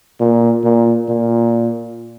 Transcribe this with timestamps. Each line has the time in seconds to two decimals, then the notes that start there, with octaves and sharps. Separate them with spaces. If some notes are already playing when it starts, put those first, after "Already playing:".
0.20 A#2
0.64 A#2
1.09 A#2